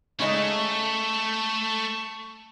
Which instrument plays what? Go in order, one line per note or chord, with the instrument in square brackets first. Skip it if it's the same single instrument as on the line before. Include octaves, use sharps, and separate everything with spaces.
[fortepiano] C#3 G#3 D#4 [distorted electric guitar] A3 [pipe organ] A5 C#6